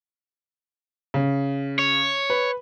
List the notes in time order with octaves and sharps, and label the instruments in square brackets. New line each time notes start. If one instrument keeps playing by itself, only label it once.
[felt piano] C#3
[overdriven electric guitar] C#5
[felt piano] B4